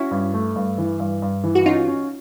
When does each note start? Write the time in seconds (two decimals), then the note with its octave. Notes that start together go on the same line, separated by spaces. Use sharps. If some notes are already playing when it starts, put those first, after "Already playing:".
Already playing: C#4 E4 F#4
0.11 G2
0.34 A3
0.56 G2
0.78 E3
1.00 G2
1.22 G2
1.44 E3
1.55 F#4
1.66 C#4 D#4 F4
1.88 C#4